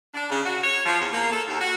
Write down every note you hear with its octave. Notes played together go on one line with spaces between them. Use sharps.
D4
C#3
F#4
C#5
F3
E2
A#3
A4
D#2
F#4